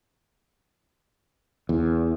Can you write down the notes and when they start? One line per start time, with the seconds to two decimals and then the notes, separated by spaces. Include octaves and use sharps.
1.69 E2